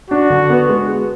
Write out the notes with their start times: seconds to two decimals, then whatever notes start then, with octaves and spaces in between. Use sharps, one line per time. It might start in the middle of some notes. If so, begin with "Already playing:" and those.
0.10 D4 F#4
0.30 D3
0.50 B3
0.69 G#3